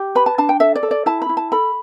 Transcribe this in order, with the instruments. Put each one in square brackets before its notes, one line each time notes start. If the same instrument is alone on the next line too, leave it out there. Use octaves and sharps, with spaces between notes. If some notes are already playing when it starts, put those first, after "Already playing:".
Already playing: [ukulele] G4
B4 B5
A5
D4 A5
G5
A4 E5
D5
A4
D5
E4 A5
B5
E4
A5
A4 B5